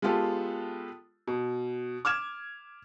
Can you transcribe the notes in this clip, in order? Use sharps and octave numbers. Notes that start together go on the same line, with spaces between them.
G#3 B3 F4 G4 A4
B2
D6 F6 G#6 E7